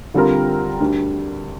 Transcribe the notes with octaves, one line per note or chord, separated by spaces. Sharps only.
D3 G3 C4 F4 A#4
D2 D3 G3